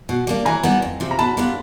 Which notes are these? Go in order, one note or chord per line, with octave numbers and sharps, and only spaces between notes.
B2
G3 A#3 D4
E3 G#5 A#5
G3 B3 D#4
F2
C3 F3
A#5
B2 A5 B5
G3 B3 D4 F4